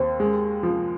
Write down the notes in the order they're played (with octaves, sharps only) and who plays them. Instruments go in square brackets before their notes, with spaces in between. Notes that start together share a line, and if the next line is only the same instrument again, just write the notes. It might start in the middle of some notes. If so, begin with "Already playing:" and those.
Already playing: [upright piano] D#2 [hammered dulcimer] C4
[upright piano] G#3
F3